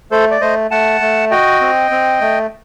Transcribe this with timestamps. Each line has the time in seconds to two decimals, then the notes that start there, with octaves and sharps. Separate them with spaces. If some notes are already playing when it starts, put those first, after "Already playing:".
0.11 A3 A4 C5
0.31 D5
0.41 A3 C5 D#5
0.71 A3 F#5 A5
1.01 A3
1.31 F#4 D#5 G5
1.61 C4
1.91 C4
2.21 A3